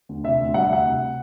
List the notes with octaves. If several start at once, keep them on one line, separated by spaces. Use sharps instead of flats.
D2
C3 E5
D2
G3 F#5
E5
D2 F#5
C3